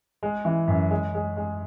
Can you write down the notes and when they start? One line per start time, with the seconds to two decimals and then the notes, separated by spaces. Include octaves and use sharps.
0.23 G#3
0.45 E3
0.68 F#2
0.91 G#3
1.15 G#3
1.37 G#3